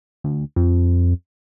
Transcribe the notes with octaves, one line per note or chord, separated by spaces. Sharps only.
D2
F2